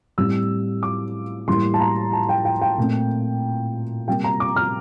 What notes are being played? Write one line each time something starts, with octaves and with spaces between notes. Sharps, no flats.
A2 G3 C4 E6
D6
A2 E3 G3 A#3 C6
A5
A#5
A5
G5
G5
G5
A#2 A3 C4
C3 G3 A#3 G5
A#5
D6
F6